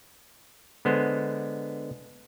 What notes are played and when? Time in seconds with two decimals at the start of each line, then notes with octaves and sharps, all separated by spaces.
0.85 D3 G#3 B3 C5